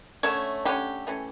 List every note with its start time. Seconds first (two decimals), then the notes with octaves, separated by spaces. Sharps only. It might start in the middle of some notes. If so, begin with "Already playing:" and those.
0.23 D3 A3 C#4 C#5 E5
0.65 D3 A3 C#4 E4 G4
1.07 E3 A3 C#4